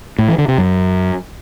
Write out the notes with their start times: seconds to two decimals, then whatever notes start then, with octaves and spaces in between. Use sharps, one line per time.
0.18 A2
0.28 E3
0.38 D3
0.48 C3
0.58 F#2